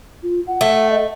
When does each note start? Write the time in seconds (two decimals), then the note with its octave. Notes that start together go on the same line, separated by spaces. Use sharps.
0.23 F4
0.47 F#5
0.61 A3
0.90 D#5